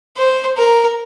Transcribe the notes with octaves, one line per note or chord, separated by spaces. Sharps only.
C5
A#4